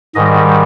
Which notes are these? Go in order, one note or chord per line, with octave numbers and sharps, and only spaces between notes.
G#2 D#3 G3 D#5